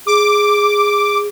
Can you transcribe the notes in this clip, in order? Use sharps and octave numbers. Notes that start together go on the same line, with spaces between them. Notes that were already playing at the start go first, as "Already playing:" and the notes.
G#4 D6